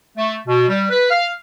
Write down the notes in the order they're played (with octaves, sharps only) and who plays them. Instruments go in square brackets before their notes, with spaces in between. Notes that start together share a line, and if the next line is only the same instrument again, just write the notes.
[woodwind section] A3
B2
G3
B4
F5